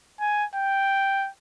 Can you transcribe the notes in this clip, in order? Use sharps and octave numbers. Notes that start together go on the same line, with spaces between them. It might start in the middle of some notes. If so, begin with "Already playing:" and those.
G#5
G5